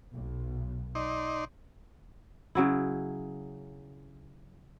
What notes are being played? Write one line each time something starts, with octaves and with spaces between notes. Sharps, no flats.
B1
D#4 D5 C6
C#3 F#3 E4